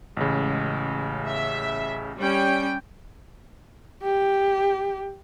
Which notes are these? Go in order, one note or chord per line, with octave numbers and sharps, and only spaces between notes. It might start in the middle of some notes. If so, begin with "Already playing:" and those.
A1 C#3 G#3
E5
G3 C#4 G5
G4